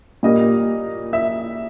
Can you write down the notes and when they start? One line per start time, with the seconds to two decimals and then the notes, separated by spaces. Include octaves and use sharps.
0.23 A#2 G3 A#3 D#5
1.13 E5